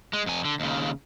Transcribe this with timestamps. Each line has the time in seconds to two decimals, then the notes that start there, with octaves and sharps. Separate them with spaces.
0.13 G#3
0.26 F2 G#5
0.45 D3
0.60 D#2 C#3